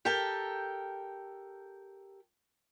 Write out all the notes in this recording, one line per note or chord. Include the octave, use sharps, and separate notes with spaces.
G4 A4 A#4 G5 A5